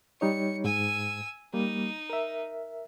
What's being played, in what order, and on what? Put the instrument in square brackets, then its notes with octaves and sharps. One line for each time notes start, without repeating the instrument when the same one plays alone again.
[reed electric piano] G3 D#4 C#5 [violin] C#7
[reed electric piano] G#2 [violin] G#5 E6
[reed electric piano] G3 A#3 [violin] D#4
[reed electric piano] A#4 E5